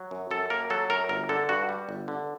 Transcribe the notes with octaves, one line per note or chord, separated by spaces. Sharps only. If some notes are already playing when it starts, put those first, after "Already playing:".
Already playing: F#3
F#2
F#2 A4
A#3 A#4
F#3 A4
F#2 A#4
G1 A#4
D3 A4
G2 F#4
G3
G1
D3